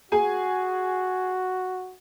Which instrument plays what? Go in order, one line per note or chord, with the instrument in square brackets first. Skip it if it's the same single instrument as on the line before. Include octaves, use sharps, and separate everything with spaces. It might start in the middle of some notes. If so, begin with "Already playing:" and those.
[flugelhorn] F#4 [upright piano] G#4 G#5